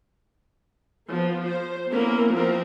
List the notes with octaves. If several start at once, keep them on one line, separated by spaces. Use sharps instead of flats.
F3 B3
C5
A#3 B3 C#4 E4 A#4
F3 B3 C4 A#4